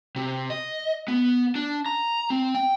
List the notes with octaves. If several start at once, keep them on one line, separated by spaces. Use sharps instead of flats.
C3
D#5
B3
D4
A#5
C4
G5